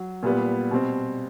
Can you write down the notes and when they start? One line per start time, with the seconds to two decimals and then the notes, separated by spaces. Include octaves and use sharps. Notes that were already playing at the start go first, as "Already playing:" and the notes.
Already playing: F#3
0.23 A#2 G3 B3
0.71 B2 G3 C4